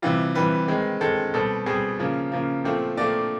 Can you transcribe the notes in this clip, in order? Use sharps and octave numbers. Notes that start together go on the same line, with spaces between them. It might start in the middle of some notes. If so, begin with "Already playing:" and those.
C3 E3 G3 F4
C3 E3 G3 B4
D#3 G#3 C4
D#3 G#3 C4 A4
B2 G3 C4 A4
B2 G3 C4 G#4
C#3 F3 A#3
C#3 F3 A#3
A#2 F3 A3 C4
A#2 F3 A3 C4 D5